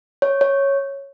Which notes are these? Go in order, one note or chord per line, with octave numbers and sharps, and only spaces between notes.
C#5
C#5